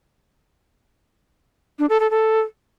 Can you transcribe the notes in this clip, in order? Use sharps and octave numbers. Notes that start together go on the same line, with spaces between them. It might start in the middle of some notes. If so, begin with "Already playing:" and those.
D4
A4
A4
A4